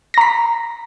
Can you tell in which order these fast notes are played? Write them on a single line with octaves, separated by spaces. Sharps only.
A#6 A#5 B6